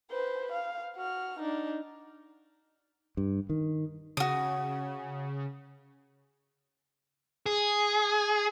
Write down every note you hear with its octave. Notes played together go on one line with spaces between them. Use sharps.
B4 C5
F5
F#4 F6
D4 D#4
G2
D#3
C#3 F#4 D#6
G#4